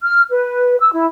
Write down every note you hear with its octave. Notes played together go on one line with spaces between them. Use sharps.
F6
B4
E6
E4